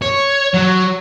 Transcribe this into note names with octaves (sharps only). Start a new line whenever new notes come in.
C#5
F#3